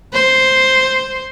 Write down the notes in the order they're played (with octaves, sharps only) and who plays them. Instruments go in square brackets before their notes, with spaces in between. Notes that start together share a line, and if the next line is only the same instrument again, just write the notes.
[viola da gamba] C5